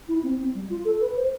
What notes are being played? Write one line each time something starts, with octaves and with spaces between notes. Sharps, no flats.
E4
C4
C4
G3
F4
A4
B4
C5